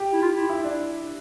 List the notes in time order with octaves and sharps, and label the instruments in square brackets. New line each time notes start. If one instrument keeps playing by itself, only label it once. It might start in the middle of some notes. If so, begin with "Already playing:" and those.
Already playing: [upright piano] G4
[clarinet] E4
F4
E4
[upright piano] E4
D4